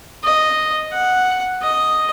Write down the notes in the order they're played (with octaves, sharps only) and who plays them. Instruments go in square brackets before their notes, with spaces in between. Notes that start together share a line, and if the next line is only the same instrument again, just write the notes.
[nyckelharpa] D#5
F#5
D#5